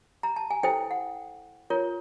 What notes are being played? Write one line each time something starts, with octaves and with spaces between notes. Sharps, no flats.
A#5
A5
G#5
E4 A4 C5 G5
F#5
F4 A#4 C#5